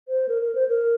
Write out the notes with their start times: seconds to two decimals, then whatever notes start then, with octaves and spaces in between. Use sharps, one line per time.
0.08 C5
0.28 A#4
0.42 A#4
0.55 C5
0.69 A#4